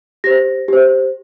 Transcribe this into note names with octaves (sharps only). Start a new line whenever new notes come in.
G4 C5 A#6
G4 C5